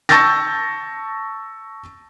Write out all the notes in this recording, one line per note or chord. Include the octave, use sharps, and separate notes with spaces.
A5 C#6 E6 G6 A6 A#6